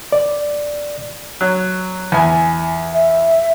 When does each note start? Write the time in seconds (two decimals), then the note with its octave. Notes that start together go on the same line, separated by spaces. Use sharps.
0.12 D5
1.41 F#3
2.12 E2 G#5
2.94 E5